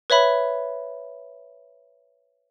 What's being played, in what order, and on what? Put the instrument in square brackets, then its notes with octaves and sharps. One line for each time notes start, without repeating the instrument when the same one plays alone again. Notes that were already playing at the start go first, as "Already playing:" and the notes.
[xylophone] B4 C#5 E5 B5